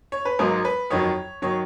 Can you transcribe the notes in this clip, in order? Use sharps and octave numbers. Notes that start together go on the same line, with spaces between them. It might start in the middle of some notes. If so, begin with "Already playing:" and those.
C#5
B4
G#1 G#2 F#3 A#4
B4
F2 D#3 F#3 C#5
D#3 F#3 C#5